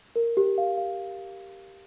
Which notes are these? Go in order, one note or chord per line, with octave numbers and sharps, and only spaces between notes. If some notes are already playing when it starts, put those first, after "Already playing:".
A#4
G4
F5
F5